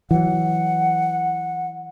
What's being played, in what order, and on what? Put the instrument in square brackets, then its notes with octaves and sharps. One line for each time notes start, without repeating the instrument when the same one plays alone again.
[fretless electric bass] E3 F#3 [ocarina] F#5